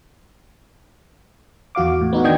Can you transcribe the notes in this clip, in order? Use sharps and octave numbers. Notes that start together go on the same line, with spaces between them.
E2 F#4 F5 D6
A2
B3 D#4 F#4
D#3 D4 D#5 G5 G#6